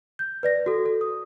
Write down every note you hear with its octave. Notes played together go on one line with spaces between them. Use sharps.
G6
B4 D5 A#6
F#4 A4
A4
D#6